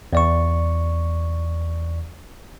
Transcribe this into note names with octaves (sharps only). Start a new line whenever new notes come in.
E2 D5 C#6